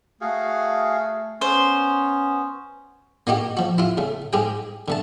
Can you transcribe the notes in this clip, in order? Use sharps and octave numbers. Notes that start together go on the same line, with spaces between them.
A3 F#4 G#4 F5
B3 C#4 C5
A#3 D#4 F#4 G4
F3 F#4
E4 F4
C#3 A3
G#2 G4 G#4 G5
D3 A3 A5